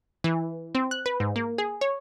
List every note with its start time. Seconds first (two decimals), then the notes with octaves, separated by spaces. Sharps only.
0.24 E3
0.75 C4
0.91 F#6
1.06 B4
1.20 G#2
1.36 A#3
1.58 G#4
1.81 C#5